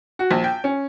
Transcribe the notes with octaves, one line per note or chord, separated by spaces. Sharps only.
F#4
A#1
G5
C#4